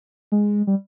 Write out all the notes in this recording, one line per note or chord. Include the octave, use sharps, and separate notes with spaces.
G#3
G3